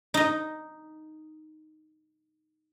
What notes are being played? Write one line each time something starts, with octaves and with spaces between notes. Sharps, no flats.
D#4 D#5